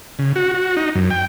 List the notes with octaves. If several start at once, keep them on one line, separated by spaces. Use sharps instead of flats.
C#3
F#4
F#4
D#4
F#2
G5